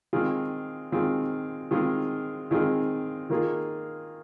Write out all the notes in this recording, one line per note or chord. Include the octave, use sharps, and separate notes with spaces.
D#3 G#3 C4 F4 G#4
D#3 G#3 C4 F4 G#4
D#3 G#3 C4 F4 G#4
D#3 G#3 C4 F4 G#4
D#3 A#3 F4 G#4